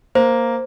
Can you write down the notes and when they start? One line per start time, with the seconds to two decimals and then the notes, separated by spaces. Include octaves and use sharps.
0.15 A#3 C5